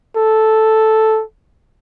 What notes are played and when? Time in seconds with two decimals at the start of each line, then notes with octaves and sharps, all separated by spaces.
0.17 A4